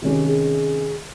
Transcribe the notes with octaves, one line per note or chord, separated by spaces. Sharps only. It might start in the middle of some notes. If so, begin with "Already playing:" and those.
C3 D#3 G#3 C#4 G4
G#4